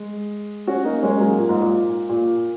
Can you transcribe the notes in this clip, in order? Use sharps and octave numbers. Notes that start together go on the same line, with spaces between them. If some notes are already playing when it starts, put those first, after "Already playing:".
Already playing: G#3
C#4 F#4
A#3 D#4
G#3 C#4
F#3 A#3
A#2
G#2
A#2
A#2